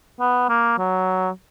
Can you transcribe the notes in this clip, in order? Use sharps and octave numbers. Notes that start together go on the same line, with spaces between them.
B3
A#3
F#3